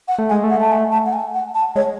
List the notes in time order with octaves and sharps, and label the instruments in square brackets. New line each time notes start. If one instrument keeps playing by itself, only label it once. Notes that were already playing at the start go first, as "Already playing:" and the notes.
[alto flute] F#5
[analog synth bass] A3
[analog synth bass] G#3 [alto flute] G#5
[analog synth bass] A3
[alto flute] F#5
A5
G#5
A5
F#5
G#5
F#5
A5
[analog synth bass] G#3 [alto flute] C#5